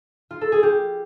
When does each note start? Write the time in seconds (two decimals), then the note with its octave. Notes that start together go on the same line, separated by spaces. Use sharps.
0.31 F4
0.41 A4
0.52 G#4
0.63 G4